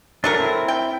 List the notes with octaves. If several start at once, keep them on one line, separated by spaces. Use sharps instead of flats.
F#3 A3 D4 A#4
C4 E4
G5